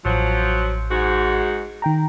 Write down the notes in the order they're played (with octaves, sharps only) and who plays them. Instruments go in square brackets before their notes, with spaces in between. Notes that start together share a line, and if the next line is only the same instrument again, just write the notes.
[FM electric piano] A1 [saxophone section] F3 F#3
[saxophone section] G#2 F#4
[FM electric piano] D#3 G5 A#5